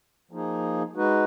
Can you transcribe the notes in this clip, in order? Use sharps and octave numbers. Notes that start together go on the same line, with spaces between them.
F3 A#3 D#4 G#4
G#3 D#4 F#4 B4